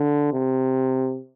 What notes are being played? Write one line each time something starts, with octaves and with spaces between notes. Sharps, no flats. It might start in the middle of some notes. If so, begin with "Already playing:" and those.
Already playing: D3
C3